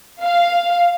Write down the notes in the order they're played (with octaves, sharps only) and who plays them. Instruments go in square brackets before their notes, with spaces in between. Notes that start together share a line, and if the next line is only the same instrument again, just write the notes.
[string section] F5